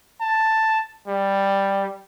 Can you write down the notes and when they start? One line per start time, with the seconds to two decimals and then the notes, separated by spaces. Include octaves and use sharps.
0.21 A5
1.08 G3